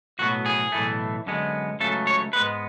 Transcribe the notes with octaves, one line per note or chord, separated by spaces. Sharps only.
B1 A2 F#3 B3 F#4
G#4
B1 A2 E3 A3
F#2 D3 G#3 B3
C#2 C#3 F#3 A3 A4
C#5
G#2 G#3 B3 B4